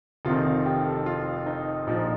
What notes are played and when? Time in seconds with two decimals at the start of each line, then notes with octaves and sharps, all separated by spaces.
0.25 F1 F2 C3 D#3 F4
0.66 G4
0.85 A4
1.06 F4
1.46 D#4
1.87 A#1 A#2 F3 D#4